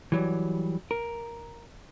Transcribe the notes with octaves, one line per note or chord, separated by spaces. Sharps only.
E3 F#3 G3
A#4